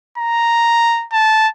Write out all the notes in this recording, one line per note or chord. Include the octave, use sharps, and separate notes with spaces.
A#5
A5